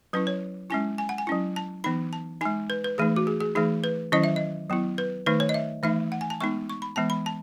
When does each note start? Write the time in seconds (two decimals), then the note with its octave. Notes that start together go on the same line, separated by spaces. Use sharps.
0.13 F#3 C#4 E4 B4
0.27 C#5
0.70 G#3 C#4 E4 G#5
0.98 G#5
1.09 F#5
1.18 G#5
1.27 F#3 C#4 E4
1.56 A5
1.84 E3 B3 D#4 B5
2.13 A5
2.41 D#4 G#5
2.45 G#3
2.70 B4
2.84 B4
2.98 E3 A3 D#4 G#4
3.16 F#4
3.27 G#4
3.41 G#4
3.55 E3 A3 D#4 G#4
3.84 B4
4.12 D#3 F#3 C#4 E4 D#5
4.24 E5
4.36 D#5
4.70 F#3 B3 E4
4.98 B4
5.26 D#3 A3 D#4 B4
5.40 C#5
5.49 D#5
5.54 E5
5.83 E3 A3 D#4 E5
6.12 F#5
6.21 G#5
6.30 A5
6.40 G#3 B3 D#4 C#6
6.69 C#6
6.82 B5
6.96 E3 G#3 B3 A5
7.10 B5
7.26 A5